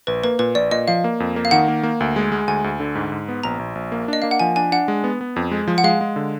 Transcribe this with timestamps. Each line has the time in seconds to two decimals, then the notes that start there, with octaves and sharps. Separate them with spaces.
0.07 A#1 B4
0.24 A#3 B4
0.39 A#2 B4
0.55 A#1 D5
0.71 A#2 D#5
0.88 F3 F5
1.04 A#3
1.20 F2
1.36 A#3
1.45 F5
1.51 D#3 F#5
1.68 A#3
1.83 A#3
2.00 D2
2.16 G#3
2.32 G#3
2.48 D2 G#5
2.64 D2
2.80 D3
2.95 G#2
3.12 G#2
3.29 B3
3.43 A#1 A#5
3.59 A#1
3.75 A#1
3.92 A#3
4.08 D4 D#5
4.22 A#3 F5
4.31 F#5
4.39 F3 G#5
4.56 D4 G#5
4.72 D4 F#5
4.88 G#3
5.04 B3
5.21 B3
5.36 F2
5.52 G#3
5.68 F3
5.78 F#5
5.84 G#3 F5
6.01 G#3
6.16 D3